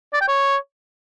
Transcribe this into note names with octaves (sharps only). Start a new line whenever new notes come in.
D5
G5
C#5